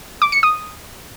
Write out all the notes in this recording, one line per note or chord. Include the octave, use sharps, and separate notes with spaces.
D6
C#7
D#6